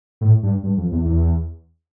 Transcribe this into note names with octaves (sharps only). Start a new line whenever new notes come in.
A2
G2
G2
F2
E2
E2